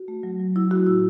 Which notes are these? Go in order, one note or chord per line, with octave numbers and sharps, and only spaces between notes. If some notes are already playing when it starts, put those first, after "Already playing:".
Already playing: F#4
A3
F#3
F#3
F#3 E4
A3 F#4
A2 E4